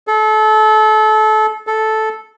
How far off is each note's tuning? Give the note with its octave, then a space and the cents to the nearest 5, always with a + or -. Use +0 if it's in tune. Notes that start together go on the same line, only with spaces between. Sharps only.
A4 -30
A4 -10